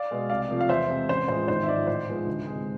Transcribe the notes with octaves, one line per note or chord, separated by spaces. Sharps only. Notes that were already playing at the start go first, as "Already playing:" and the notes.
Already playing: D5 F5
B2 G#3
C2 D5 F5
C3 F3 A3
F5
E2 C5 E5
C3 G#3
A1 C5
A2 F3 G#3 C5
G#1 C5
E5
G#2 F3 D5
A2 C5
F3 G#3 B3
D2
C3 G#3